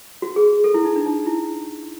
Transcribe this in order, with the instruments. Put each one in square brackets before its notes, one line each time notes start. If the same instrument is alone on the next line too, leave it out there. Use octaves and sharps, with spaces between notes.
[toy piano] F#4
G#4
A4
E4
D#4
D4
D#4
E4